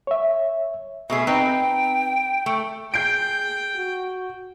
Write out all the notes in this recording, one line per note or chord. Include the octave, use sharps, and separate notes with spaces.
C#5 E5
B2 A3 G#4 E5
C4 D#4 B4 G5
A3
G#4 G5 G6 C7 D7
F#4